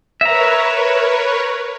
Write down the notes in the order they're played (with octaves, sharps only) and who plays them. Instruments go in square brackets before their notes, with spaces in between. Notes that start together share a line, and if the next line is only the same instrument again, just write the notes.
[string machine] A#4 B4 C#5 [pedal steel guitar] E5 A#5